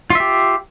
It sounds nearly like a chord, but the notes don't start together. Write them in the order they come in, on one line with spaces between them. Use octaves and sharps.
F4 E5 G4